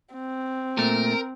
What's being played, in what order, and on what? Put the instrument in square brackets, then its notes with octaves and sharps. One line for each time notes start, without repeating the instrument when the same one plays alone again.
[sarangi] C4
[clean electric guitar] A#2 A3 [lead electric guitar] A#4